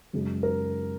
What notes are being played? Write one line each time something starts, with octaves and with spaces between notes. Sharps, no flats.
F#2 C#3 G#3
A#4